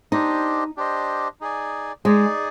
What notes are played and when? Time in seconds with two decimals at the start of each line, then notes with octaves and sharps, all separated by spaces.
0.12 D4 D#4 G4 C5 D#5
0.77 D4 G4 C5 D#5
1.41 D#4 G#4 D5 G#5
2.05 G#3 D#4 G#4 D5 G#5